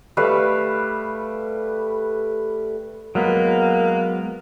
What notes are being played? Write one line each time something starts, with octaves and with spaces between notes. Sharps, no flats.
G3 A3 B4 F5
F#3 G#3 A#3 B3